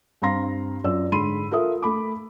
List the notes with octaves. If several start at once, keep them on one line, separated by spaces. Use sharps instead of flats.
G2 C4 F5 A#5 C6 A#6
F#2 F4 D5 E6
G#2 D3 B5 C6 D#7
F4 A4 A#4 E5 D#6
A3 B5 D6